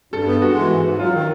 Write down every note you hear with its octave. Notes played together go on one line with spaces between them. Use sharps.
G2 A4
B3
G#3 F#4
E3
G#2
G#2
F#3 F4
D#3